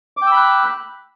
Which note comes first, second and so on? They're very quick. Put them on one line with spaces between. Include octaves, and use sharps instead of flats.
D6 G5 E6 B5 F#6